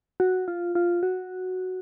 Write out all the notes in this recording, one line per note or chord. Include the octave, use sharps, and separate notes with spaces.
F#4
F4
F4
F#4